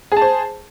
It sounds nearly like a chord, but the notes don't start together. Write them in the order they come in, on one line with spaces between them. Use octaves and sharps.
G#4 A5 C5